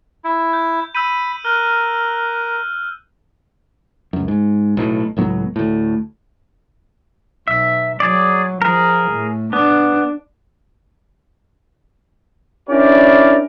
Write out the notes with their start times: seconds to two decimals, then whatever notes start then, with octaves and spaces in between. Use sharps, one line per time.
0.24 E4
0.53 G6
0.95 B5 E6 G6 D#7
1.45 A#4 F6 F#6
4.13 C#2 F#2
4.28 G#2
4.77 B1 A2
5.17 C#2 A2 F#3 B3
5.56 D2 A2
7.48 B1 E5
8.00 F#3 G#4 D5
8.62 F3 G#4 A#4
9.11 A2
9.53 B3 D4
12.69 C#4 D4 E4 G4 A#4 D5